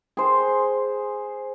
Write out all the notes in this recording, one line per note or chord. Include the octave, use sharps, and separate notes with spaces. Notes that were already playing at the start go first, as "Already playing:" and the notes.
G#4 C5